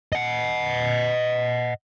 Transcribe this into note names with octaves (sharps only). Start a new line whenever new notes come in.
D#5 F#5